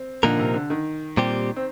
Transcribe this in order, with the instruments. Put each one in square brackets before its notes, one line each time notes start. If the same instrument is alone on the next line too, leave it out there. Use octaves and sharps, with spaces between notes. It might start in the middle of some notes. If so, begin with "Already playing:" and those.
Already playing: [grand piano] C4
[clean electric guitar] A#2 F3 A#3 D#4 A#4 [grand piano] D3
[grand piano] C3
D3
D#3
[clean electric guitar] A#2 G3 C4 G4
[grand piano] C4